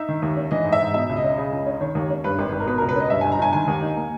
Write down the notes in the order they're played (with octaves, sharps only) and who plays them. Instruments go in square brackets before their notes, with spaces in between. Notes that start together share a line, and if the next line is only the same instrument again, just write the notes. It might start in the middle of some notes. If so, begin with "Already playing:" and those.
Already playing: [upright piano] D#4 E5
D#3
D#2
C#4
E3 D#5
G#2
E5
G#2
B2 E5
C#2
D#5
C#4
C#3
C#2
C#4
D#3 C#5
D#2
C#4
G2 B4
G#1
G#1
A#4
B2 B4
C#2 A#4
B4
C#4 D#5
G2 E5
G1 G#5
A#5
G1 G#5
D#3 G#5
D#2
D#4
A#3